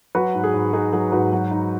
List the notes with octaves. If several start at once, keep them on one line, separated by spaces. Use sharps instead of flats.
F#3 F#4 B4
G#2
G#4
G#2
D#4 G#4
F#3 G#4
G#2 F#4 B4
F#3
D#4